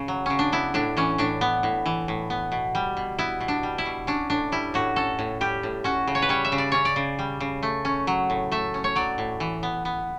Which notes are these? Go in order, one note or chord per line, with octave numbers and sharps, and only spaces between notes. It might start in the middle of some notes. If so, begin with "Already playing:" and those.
Already playing: C#3 C#4
F#3
C#3 C#4
D4
B3 E4
A2 D4
E3 C#4
A2 D4
B3
A2
E3
A2
B3
B2
G3
B2
B3 E4
B2
D4
G3
E4
B2
C#4 D4
A2 D4
G3 E4
A2 F#4
C#4 A4
A2
G3 G4
A2
C#4 F#4
C#3
C#5
B4
G3 C#5
E5
C#3
D5
C#4 C#5
D5
C#3
G3
C#3
A3
C#4
F#3
A2
A3 E5
C#4
C#5
F#3 D5
A2
E3
B3
B3